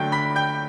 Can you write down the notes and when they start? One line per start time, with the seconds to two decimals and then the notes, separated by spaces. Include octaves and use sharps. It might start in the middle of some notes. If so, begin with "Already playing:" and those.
Already playing: D3 F#3 A3 G5 G6
0.12 B5 B6
0.36 G5 G6